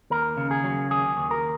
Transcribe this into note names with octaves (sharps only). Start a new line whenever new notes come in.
D#2 A#4
C#3
G#4
F#3
D#2 G#4
D#2
A#4